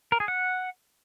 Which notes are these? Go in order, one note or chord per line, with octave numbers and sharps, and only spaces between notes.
A#4
G#4
F#5